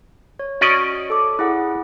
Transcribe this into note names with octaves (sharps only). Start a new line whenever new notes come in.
C#5
C#4 F#4 D5 D#5 C#6 D#6
A4 D6
E4 G#4 F#5